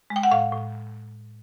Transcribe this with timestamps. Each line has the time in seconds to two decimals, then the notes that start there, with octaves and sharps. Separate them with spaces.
0.10 G#3
0.16 G5
0.23 F#5
0.31 A2 F5
0.53 A2